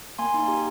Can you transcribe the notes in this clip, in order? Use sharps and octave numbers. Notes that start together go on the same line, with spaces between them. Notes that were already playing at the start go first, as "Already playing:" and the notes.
A#3 G#5 C6
D#4
G4